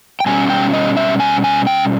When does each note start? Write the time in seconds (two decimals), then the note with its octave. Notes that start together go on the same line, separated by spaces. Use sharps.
0.20 G5
0.26 B2 G3 C#4 G#5
0.50 G5
0.73 D#5
0.97 E5
1.20 G#5
1.44 G#5
1.67 G5